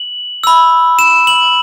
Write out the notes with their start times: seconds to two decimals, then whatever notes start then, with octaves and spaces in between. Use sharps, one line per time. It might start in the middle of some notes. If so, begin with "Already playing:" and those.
Already playing: F#7
0.44 B5 E6
0.99 E7
1.27 F#7